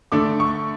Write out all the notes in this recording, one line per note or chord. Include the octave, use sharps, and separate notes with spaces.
D3 A3 D4 D6
C#6